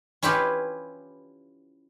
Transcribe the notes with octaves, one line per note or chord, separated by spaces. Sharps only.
C#4 E4 F4 G4 B4